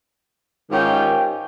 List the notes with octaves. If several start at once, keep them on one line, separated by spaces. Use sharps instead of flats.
G#2 D#3 C#4 F4 G4 G5